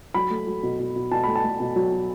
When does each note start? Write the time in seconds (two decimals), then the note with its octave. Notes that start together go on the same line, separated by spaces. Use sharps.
0.14 F#3 B5
0.30 A3
0.47 F#3
0.63 B2
0.79 B2
0.96 B2
1.11 B2 A5
1.24 A3 B5
1.35 A5
1.44 A3
1.60 B2
1.76 F#3
1.92 B2